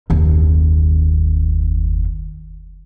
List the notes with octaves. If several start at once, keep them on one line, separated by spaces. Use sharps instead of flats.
F#1 D#2